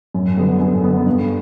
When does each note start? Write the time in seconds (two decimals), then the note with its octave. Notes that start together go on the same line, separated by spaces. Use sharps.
0.14 F#2
0.37 D3 G3 B3
0.60 F#2
0.83 D3 G3 B3
1.07 G2